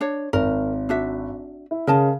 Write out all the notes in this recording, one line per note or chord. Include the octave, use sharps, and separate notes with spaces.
D4 C#5
G#1 A#4
D4 F#4 E5
E4
C#3 A#4 D#5 A5